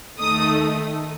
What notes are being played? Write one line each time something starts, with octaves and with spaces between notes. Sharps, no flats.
D#2 D#3 A3 D#4 D#6